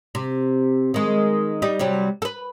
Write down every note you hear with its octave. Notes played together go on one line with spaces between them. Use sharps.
C3
D#3 G#3
G3 D#4
C3 F#3 G3
A4 B4